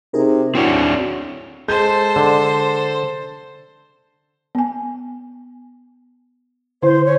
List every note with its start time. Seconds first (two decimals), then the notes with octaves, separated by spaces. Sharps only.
0.14 C3 D#4 G#4 A#4
0.55 C4 D4 E4 F#4 C#5 G5
1.68 G#3 A4 C5 G6
2.16 D3
4.55 B3 G#5
6.83 D3 E4 C5
7.05 C#5